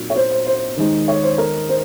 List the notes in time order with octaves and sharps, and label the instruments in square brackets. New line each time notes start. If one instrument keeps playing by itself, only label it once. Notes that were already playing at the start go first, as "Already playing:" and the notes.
Already playing: [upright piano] A#2 F#3 C4 D#4
[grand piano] C#5
C5
C5
C5
[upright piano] D#2 D#3 G#3 D#4
[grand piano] C#5
C5
A#4
C5